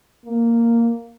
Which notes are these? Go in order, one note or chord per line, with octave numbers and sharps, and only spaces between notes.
A#3